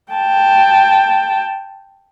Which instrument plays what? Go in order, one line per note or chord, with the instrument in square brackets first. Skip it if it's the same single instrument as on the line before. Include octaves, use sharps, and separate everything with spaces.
[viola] G5 A5